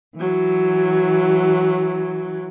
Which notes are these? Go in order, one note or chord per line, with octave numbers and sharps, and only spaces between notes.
E3 F#3